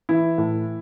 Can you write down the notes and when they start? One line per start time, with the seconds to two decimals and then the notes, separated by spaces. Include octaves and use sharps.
0.09 E3 E4
0.38 A2